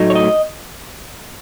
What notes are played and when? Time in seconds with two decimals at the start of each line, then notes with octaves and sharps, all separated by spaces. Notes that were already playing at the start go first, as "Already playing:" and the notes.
Already playing: A2 F#3 A3 D#4
0.10 C#5
0.15 D#5